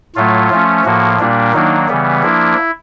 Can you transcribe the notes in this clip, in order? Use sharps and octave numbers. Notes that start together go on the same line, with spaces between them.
A2 F#3 A3 F4
F3 A3 C#4
A2 F3 A#3 F#4
A#2 G3 A#3 D4
D#3 F#3 A#3 D4 D#4
C#3 E3 G3 B3
F3 A#3 D4 E4